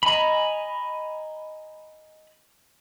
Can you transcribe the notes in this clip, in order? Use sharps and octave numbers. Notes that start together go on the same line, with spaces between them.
D#5 G#5 A#5 B5